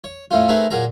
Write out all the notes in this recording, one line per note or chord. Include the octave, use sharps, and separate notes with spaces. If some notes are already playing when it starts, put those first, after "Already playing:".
C#5
A2 A3 C#4 F4
A3 C4 D#4 G#4 A#4 B4
A#2 F#3 G#4 A#5